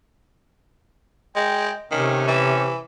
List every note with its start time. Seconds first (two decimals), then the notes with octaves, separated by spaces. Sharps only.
1.36 G#3 G5
1.91 C3 D#3 A3 C#4
2.28 E3